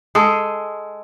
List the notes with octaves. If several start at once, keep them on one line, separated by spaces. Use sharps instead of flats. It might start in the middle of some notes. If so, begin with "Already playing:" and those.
G#3 G#4 A4